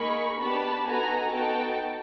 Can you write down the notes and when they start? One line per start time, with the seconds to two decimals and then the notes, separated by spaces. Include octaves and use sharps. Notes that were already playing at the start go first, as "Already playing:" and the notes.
Already playing: A#3 D#4 G#4 B5 C#6
0.38 B3 D4 G4 A5 B5
0.85 B3 D#4 F#4 A4 G#5 A#5
1.32 B3 D#4 F#4 A4 G5 A5